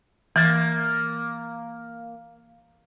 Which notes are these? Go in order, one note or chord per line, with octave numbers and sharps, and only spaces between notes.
E3 A#3 A6